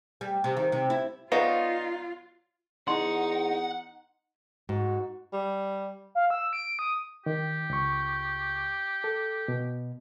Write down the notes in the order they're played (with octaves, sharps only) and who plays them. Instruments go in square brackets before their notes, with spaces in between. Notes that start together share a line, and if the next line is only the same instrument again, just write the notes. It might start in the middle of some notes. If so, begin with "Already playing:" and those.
[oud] G3
C3
D#3
C3
E4
[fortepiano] B3 [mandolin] D#4 [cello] F4 [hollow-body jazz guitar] C#5 D5 F5
[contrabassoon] E2 [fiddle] D#4 [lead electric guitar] F#5 [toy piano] C6
[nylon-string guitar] G#2 [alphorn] F#4
[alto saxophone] G3
[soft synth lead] F5
E6
D7
D#6
[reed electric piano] D#3 [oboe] G4
[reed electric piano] C#2 C#6
A4
B2